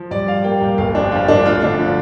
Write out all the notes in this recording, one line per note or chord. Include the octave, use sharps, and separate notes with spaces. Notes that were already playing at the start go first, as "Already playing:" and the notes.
Already playing: F3
G2 D5
G3 F5
A#3 G5
G2
G1 F5
F2 D4
F3 F4
G1 D4
D2 F4
D3 D4
F3